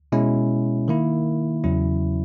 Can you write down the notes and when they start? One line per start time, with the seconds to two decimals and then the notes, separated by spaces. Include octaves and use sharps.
0.12 B2 G#3 C#4 E4
0.88 D#3 A#3 E4
1.64 E2 C#3 F#3 C#4 E4